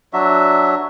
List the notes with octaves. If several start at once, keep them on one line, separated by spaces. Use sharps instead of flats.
F#3 D4 F#4 E5